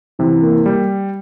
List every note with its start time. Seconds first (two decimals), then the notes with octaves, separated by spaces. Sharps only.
0.19 C3 E3
0.42 A#3
0.66 G3